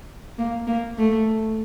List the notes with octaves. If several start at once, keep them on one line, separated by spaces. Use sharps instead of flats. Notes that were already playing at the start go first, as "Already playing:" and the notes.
A#3
A#3
A3